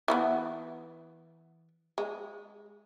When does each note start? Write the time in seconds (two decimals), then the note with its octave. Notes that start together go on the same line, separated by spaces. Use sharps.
0.08 E3 F#3 B3
1.98 G#3